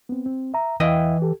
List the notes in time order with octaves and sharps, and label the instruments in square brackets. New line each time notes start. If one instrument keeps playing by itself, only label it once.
[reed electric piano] B3 C4
C4
E5 A#5
[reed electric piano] E2 F5 [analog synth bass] E3 [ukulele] E4 D#5 G5
[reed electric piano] G4 A4